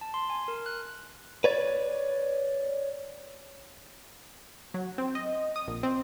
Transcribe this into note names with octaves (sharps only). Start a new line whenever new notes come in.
A5
C6
G#5
A#4
F#6
B4 C#5 D5
F#3
C4
D#5
D#6
A#1
C4